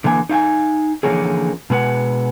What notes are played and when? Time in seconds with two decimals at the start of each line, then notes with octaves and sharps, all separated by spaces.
0.04 D3 E3 A#3 G#5
0.29 D#4 F5 G5 G#5
1.03 D3 E3 F3 A#3 C#4 G#4
1.70 B2 G#3 B4 F#5